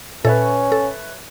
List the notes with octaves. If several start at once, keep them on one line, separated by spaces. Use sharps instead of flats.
A#2 C#4 A4 B4 C#5 E5
A4